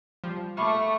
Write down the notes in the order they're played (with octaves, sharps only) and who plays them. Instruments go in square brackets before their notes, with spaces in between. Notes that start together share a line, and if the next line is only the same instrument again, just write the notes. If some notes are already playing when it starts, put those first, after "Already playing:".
[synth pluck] F3 G3
[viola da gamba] A3 [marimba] E5 B5 D6 [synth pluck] F5 [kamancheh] C#6